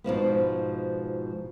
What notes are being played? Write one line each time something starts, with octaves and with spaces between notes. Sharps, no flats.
G#2 B2 F3 B3